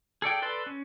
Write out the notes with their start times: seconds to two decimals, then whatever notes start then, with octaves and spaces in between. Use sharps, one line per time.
0.22 G#4 A4 D5 G5
0.42 A4 B4 D5 C6
0.66 C#4